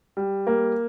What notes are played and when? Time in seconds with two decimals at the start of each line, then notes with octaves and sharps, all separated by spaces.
0.17 G3
0.47 A#3